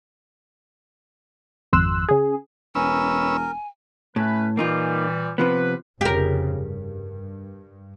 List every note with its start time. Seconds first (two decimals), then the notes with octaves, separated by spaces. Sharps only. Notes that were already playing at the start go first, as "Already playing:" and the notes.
1.72 G#1 F2 C6 E6 F#6
2.09 C#3 G#4
2.75 E1 C#4 A#4 B4 G#5 E6
4.16 A2 A3 C#4 B4
4.57 A#2 E3 G3 A#3 D#4 F4
5.38 C3 F3 B3 B4
6.01 F1 F2 C#3 G4 A#4
6.53 G2